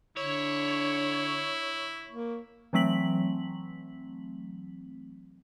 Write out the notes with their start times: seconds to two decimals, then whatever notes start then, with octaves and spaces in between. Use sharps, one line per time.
0.17 D3 E4 C#5
2.09 A#3
2.73 E3 F#3 A3 C4 B6 F#7